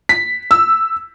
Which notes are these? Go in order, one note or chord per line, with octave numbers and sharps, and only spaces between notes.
B6
E6